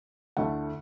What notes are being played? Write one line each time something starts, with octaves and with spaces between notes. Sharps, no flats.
D2 D3 A3 E4 F#5